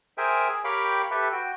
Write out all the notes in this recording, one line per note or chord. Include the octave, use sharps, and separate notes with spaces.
G#4 A#4 C5 E5 G5 G#5
G#4
G4 A#4 C#5 F5 G5 B5
G4 A4 B4 E5
F#4 G5